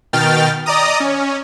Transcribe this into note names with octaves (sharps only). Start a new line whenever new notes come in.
B2 D#3 G5 F6 A6
D5 D#5 A#5 D#6
C#4